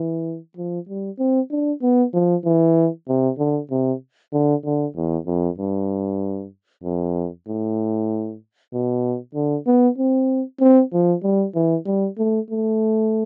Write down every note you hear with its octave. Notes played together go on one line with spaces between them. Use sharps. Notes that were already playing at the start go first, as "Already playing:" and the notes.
Already playing: E3
F3
G3
C4
D4
B3
F3
E3
C3
D3
C3
D3
D3
E2
F2
G2
F2
A2
B2
D3
B3
C4
C4
F3
G3
E3
G3
A3
A3